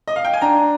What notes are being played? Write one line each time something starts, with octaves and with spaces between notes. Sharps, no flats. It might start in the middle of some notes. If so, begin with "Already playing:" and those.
D#5
F5
G5
G#5
D4 A#5